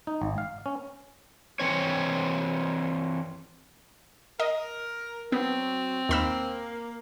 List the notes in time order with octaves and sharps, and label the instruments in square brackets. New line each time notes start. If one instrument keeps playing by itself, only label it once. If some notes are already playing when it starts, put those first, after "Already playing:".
[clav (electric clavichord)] D#4
G#1
F5
C#4
[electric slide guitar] E3 C4 C#5
[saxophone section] A#4 [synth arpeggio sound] D#5
[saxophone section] F#3 [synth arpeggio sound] B3 [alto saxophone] C4
[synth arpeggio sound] D#2 B5 E6 [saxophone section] A#3